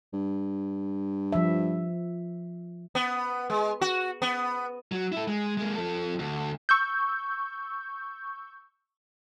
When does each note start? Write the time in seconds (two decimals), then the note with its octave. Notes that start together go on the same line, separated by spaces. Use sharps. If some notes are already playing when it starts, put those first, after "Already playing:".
0.13 G2
1.32 F3 E5
2.95 B3
3.50 G#3
3.81 F#4
4.22 B3
4.92 F#3
5.12 E4 A4
5.28 G#3
5.57 G#3 A#3
5.76 F3 A4
6.19 D2
6.69 C#6 E6 G6